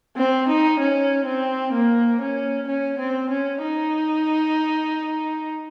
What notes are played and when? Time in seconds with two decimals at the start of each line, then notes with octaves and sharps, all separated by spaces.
0.16 C4
0.48 D#4
0.79 C#4
1.26 C4
1.73 A#3
2.21 C#4
2.67 C#4
2.99 C4
3.30 C#4
3.62 D#4